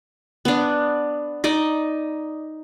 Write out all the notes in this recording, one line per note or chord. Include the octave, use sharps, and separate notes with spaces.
B3 D4
D#4 D5 D#5